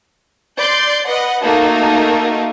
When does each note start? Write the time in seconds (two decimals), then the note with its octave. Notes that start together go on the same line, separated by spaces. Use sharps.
0.59 D5 C6 G6
1.08 B4 D#5 F#5
1.44 A3 A#3 D#4 F#4 A4